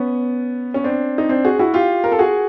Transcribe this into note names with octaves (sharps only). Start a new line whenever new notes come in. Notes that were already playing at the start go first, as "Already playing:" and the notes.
Already playing: B3 C#4
C#4
C4 D4
D#4
C4 D4
F#4 G#4
E4 F#4
F4 G4
A#4
A4
F#4 G#4